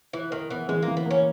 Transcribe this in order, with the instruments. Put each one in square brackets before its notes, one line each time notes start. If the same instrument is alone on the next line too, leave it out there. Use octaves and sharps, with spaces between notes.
[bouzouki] E3 [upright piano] E4
[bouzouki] D#3 [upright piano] A#4
[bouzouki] E3 [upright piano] B3
[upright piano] E3 [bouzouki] G#3
[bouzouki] A#3
[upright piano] E3
[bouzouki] B3
[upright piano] A#3 [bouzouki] C#4